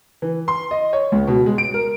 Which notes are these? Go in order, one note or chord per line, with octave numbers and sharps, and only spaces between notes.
E3
C6
D#5
C#5
C#2
B2
G#3
D7
A#4